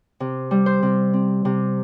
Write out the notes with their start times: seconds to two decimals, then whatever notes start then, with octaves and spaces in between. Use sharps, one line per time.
0.20 C3
0.51 G3
0.66 C5
0.83 C3
1.14 C4
1.45 C3